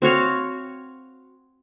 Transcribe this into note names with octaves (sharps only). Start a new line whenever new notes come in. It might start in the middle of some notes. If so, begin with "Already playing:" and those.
C4 F#4 C#5 F5